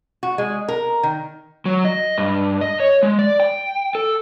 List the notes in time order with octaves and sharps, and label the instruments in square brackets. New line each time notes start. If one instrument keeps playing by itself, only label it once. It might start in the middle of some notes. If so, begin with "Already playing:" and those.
[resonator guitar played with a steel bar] F#4
G#3
A#4
D#3
[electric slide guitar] F#3
D#5
G2
D#5
C#5
G#3
D5
G5
A4